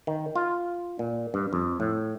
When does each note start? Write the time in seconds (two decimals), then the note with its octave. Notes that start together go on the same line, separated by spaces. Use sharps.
0.07 D#3
0.36 F4
0.99 A#2
1.34 G2
1.53 F2
1.80 A2